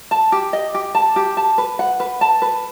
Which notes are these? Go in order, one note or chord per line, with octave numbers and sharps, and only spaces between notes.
A5
G4
D#5
G4
A5
G4
A5
B4
F#5
B4
A5
B4